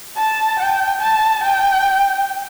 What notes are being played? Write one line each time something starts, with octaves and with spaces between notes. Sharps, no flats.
A5
G5
A5
G5